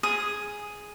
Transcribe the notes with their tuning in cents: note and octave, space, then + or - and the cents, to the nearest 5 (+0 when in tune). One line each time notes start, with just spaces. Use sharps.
G#4 +0 D#6 +5